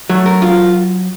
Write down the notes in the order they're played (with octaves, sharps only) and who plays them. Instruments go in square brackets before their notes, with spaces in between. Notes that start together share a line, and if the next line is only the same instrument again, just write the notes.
[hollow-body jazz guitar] F#3 [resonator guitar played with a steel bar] A3
[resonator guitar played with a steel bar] A#4
F4